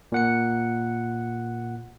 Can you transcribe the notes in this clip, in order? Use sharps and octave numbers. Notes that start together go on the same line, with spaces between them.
A#2 F#5 C#7